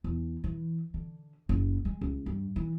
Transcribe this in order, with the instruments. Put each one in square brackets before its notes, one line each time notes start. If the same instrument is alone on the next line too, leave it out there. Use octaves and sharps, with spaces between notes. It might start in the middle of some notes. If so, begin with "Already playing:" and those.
[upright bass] E2
E3
D3
F#1
G#3
C#2
G2
E3